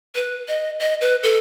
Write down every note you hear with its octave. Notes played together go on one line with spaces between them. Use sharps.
B4
D#5
D#5
B4
A4